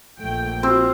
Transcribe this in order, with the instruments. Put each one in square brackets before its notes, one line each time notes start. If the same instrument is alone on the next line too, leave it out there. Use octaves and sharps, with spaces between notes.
[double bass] A#1 [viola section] A3 G5
[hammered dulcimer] C4 [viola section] F4 F#4